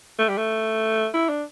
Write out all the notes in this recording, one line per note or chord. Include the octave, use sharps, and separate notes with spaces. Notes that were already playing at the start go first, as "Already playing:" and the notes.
A3
G3
A3
E4
D4